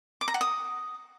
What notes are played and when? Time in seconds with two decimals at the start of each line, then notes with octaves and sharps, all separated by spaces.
0.21 D6
0.28 A#5
0.34 F#5
0.41 D#6